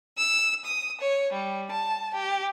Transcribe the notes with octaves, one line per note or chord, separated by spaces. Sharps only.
E6
D#6
C#5
G3
A5
G4